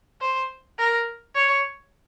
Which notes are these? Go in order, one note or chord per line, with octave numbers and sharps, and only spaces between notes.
C5
A#4
C#5